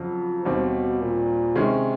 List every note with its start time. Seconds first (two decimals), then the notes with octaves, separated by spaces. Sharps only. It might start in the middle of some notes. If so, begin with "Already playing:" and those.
Already playing: F2 C#3 F3 F#3
0.45 D#2 B2 D#3 G3 C4
1.01 A#2
1.56 C3 D#3 G#3 C#4